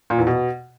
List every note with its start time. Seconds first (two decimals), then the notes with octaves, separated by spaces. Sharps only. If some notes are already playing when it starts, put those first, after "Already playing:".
0.10 A#2
0.18 E2
0.27 B2